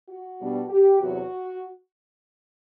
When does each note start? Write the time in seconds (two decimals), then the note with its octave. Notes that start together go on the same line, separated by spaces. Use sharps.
0.09 F#4
0.39 B2 G3 B3 D4
0.69 G4
0.98 E2 C3 F#3 F#4